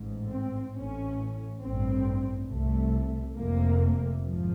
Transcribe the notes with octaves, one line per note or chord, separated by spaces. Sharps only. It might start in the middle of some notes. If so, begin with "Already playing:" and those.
Already playing: A1 G#2
C4
A1 A2 C#4
A1 G2 C4
C2 C3 A3
F1 F2 C3 A#3
G#1 G#2 F3